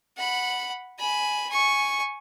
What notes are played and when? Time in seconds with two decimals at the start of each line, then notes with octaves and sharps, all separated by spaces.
0.17 F#5 B5
0.99 G#5 B5
1.49 G#5 C#6